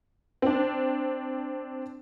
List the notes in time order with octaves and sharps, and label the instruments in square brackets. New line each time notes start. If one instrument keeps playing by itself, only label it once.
[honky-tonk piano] C4 D4